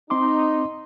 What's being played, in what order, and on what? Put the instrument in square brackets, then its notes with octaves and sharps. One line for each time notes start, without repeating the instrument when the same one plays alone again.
[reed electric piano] C4 C6 D6 [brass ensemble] D#4